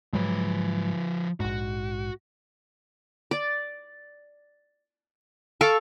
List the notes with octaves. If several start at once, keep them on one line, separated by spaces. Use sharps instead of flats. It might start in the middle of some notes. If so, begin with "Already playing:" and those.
G#2 F3 F#3 G#3 B4
A#1 G#2 F#4
D5
A4 F5 C#6 D6